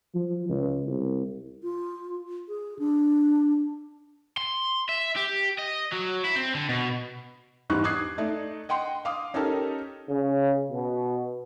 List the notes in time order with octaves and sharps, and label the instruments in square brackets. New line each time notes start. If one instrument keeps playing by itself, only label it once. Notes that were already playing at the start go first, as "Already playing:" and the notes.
[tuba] F3
C#2
C2
[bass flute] F4
G#4
D4
[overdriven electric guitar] C6
E5
G4
D#5
F#3
E4
C4
D3
B2
[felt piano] E2 G#2 G3 D#4 C#6 F#6
D6 D#6 F#6 G#6 C7
A3 D#4 D5
D#5 F#5 G5 C6
F5 D6 D#6
C#4 D#4 G4 A4 A#4
[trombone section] C#3
B2